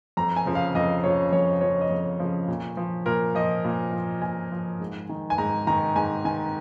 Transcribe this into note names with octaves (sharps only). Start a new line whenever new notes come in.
F2 A#5
G#5
C#3 F3
F5
F2 D#5
C#3 F3 C#5
F2 C#5
C#3 F3 C#5
D#5
F2 C#5
C#3 F3
A#2
F3
A#2 A#4
F3 D#5
A#2
F3
A#2 G#5
F3
G#2
D#3
G#5
G#2 A#5
D#3 A#5
G#2 G#5
D#3 G#5